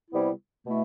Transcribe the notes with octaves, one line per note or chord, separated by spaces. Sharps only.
C3 G3 B3 E4
B2 A3 E4